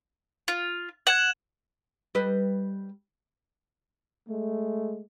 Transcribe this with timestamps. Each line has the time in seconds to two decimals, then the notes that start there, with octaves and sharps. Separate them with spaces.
0.48 F4
1.07 F#5 G#6 E7 F#7
2.15 G3 B4 D#5
4.28 G#3 A3